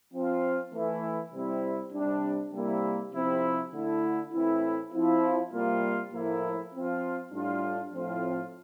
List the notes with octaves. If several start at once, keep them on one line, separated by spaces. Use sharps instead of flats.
F3 C4 F4
E3 A3 E4
C3 G3 C4 E4
C3 G3 D4
C3 G3 A#3 E4
C3 F3 C4 E4
D3 A3 E4
A2 E3 A3 C4 E4
F3 C4 E4
C3 G3 A#3 F4
A2 F3 A#3 E4
F3 C4 F4
A2 G3 D4 F4
A2 F3 C4 F4